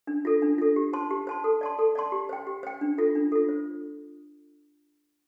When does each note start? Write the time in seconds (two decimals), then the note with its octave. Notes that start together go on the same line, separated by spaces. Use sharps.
0.07 D4
0.25 F4 A4
0.42 D4
0.58 F4 A4
0.76 G4
0.93 C5 A5 C6
1.11 G4
1.27 C5 A5 C6
1.44 A4
1.61 D5 A5 C6
1.79 A4
1.95 D5 A5 C6
2.12 G4
2.29 C5 G5
2.47 G4
2.63 C5 G5
2.81 D4
2.98 F4 A4
3.15 D4
3.32 F4 A4
3.49 C5